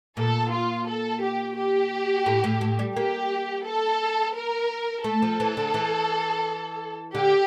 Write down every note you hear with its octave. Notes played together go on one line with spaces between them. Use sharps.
A#2 A4
F4
A4
G4
G4
A2
A2
A2
G3
A#3 G4
A4
A#4
A3 A4
F3
E3
D3
E3
D3 G4